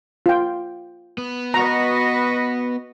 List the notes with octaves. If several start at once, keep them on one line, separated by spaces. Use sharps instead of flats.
F4 G5
B3
F#4 B4 D#5 A#5